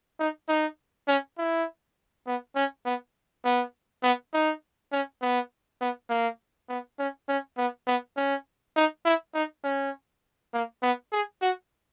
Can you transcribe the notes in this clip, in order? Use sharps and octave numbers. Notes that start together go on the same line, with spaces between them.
D#4
D#4
C#4
E4
B3
C#4
B3
B3
B3
D#4
C#4
B3
B3
A#3
B3
C#4
C#4
B3
B3
C#4
D#4
E4
D#4
C#4
A#3
B3
G#4
F#4